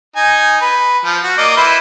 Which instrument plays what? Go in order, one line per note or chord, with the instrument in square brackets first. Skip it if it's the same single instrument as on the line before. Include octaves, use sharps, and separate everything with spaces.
[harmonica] D#4 G#5
B4
F3
F#4
A#3 D5 D#5
E4 B4 C5